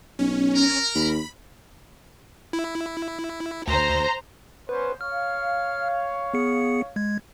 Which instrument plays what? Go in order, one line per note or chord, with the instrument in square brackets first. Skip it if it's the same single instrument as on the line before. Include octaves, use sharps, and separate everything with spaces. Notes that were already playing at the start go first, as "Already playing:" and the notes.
[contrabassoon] B1 [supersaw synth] C#4
[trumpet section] A#4
[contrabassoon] D#2 [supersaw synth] B5
[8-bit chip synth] E4
[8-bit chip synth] D2 [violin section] C5 A#5
[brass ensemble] B3 C#4 C5 [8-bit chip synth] B4
[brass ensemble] C#5 F5 [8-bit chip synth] F6
[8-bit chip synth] B3 G#4 C#7
G#3 G#6